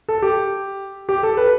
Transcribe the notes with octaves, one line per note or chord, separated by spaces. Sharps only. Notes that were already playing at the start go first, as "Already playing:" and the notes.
A4
G4
G4
A4
B4